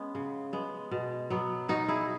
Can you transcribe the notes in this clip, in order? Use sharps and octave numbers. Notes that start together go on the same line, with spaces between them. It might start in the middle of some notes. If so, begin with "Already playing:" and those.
Already playing: G#3 B3 C#4
C#3
G#3 B3
B2
F#3 B3
B2 D#4 F#4
E4 G#4